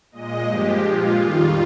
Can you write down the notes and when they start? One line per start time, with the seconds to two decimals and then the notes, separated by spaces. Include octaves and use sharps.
0.12 A#2 G#3 D#5
0.47 G2 F3 G#3 G4
0.84 A#2 G#3 F4
1.19 F2 D#3 G3